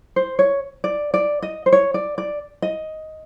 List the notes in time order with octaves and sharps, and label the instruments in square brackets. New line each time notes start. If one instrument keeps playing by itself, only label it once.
[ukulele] C5
C#5
D5
D5
D#5
C5
C#5
D5
D5
D#5